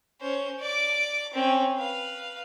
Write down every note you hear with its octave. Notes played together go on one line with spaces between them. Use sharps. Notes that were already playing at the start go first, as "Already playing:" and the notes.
C#4 C5
D5 D6
C4 C#4
B4 F5